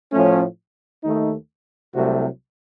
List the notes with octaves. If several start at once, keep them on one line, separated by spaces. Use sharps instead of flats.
A2 F3 A3 C#4
D#2 D#3 A3 D#4
C2 C3 F#3 A3 F#4